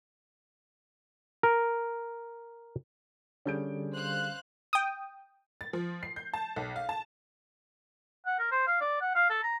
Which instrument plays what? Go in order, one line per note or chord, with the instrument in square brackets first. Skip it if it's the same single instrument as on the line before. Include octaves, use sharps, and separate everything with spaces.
[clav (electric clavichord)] A#4
[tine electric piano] D3 G3 G#4 [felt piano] C#4 G6 D7
[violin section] C5 F5 F#6
[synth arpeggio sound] G5 D#6
[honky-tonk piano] A6
F3
C7
G6
A5
B1
F5
A5
[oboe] F#5
A#4
C5
F5
D5
F#5
F5
A4
A#5